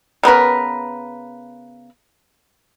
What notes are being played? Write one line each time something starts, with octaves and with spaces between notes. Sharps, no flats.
C#3 B3 A#4 B4